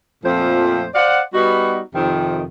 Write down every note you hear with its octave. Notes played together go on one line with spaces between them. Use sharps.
F2 A#2 F3 A3 C4 C5
C5 D5 F5 F#5
G3 B3 D#4 F#4
F2 C3 D#3